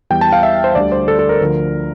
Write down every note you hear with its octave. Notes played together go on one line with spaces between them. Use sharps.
E2 E3 G3 G5
A5
F5
E5
C5
D2 D3 G3 D5
C5
A4
A4
A#4
D2 D3 F3